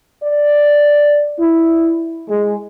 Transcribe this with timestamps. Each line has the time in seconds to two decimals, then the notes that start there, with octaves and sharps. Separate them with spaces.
0.23 D5
1.39 E4
2.28 G#3